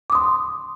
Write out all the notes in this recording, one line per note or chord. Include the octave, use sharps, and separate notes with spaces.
C6 D6 D#6